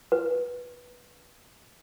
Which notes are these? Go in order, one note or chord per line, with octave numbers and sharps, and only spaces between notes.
B4